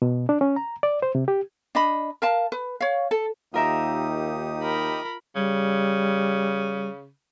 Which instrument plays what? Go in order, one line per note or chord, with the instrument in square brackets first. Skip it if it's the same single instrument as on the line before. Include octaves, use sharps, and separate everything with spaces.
[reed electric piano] B2
D4
C#4
A#5
D5
C5
C3
G4
[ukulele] D4 D#5 B5
A#4 F5 A5
B4
C#5 F5
A4
[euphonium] D#2 [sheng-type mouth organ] D#4 G4 D#6 [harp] F4 A#4 E5
[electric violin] A#4 B5
[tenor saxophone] C#3 [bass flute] G3